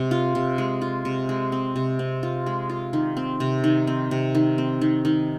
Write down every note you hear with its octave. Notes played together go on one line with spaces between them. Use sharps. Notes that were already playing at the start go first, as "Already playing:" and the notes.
Already playing: C3 G#3
F4
C3
G#3
F4
C3
G#3
C4
C3
C4
F4
G#3
F4
D#3
C4
C3
D#3
C4
C3
D#3
C4
D#3
D#3